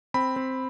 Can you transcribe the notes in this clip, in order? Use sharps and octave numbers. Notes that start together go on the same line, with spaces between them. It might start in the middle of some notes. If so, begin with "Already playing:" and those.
C4 B5
C4